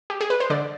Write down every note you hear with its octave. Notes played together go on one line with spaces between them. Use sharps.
G4
G#4
B4
C5
D3 D5